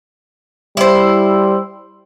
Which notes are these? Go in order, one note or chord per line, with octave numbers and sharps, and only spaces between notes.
G3 E4 C5